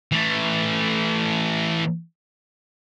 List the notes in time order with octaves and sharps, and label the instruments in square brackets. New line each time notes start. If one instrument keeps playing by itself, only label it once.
[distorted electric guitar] E3 A3